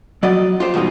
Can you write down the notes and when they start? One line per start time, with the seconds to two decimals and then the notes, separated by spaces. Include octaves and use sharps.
0.23 F#3 D5 D#5
0.60 F4 G4 C5
0.74 E2 B2 G3 G#3 D#4